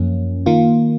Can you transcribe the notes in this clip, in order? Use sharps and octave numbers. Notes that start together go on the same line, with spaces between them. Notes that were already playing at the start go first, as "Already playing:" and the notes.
Already playing: F#2 F3 A#3 C#4
D#3 A#3 F4